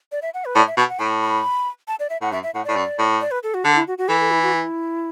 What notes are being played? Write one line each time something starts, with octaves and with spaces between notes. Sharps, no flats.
D5
E5
F#5
B4
A2 D5
E5
B2 A5
F#5
A2 A5
B5
A5
D5
E5
A2 F#5
F#2 E5
E5
A2 F#5
A2 D5
F#2
A2
D5
B4
A4
F#4
D3 A4
E4
F#4
F#4
E3 A4
A4
E4
F#4
E4